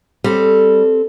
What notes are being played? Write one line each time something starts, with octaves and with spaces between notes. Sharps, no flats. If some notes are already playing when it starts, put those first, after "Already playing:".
G3 C4 A4